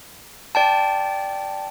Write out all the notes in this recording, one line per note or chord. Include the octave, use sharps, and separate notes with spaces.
D5 G5 A5